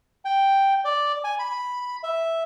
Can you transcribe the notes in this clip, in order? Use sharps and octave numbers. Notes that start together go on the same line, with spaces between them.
G5
D5
G#5
B5
E5